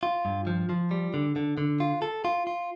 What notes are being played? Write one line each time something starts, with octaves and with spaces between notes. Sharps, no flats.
F4
G2
F3
F3
G3
D3
D3
D3
F4
A4
F4
F4